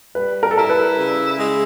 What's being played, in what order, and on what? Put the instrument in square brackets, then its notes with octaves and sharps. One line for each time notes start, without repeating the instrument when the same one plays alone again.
[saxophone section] G3 [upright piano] B4
[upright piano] A#4
A4
[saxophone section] E4 [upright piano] A#4
[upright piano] B4
[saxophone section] C#3
G#3